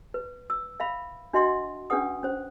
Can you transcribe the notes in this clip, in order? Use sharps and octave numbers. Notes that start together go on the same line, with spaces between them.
B4
E6
E5 F5 B5
D4 F#4 D#5 E5 F#5 C6
C#4 D4 G#4 B4 F#5 D#6
C#4 C5